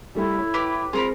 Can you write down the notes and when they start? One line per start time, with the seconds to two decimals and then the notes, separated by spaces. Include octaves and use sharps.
0.15 G3 A3 E4 G4
0.38 C#5
0.54 G4 B4 D6
0.93 G#3 C4 F4 G#4 A#4 B5